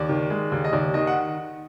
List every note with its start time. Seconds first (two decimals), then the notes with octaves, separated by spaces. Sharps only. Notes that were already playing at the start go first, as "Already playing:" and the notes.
Already playing: D#2 D5
0.09 D#3
0.30 G#3
0.52 D#2
0.65 D#5
0.73 D#2 D5
0.94 D#3 D#5
1.07 F#5